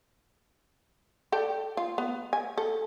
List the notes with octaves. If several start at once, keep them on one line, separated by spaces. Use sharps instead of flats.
A4 D5 G5
F4
B3
G#5
A4